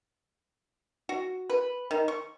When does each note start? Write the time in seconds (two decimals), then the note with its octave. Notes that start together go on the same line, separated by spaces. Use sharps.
1.09 F#4
1.50 B4
1.91 D#3
2.08 C#6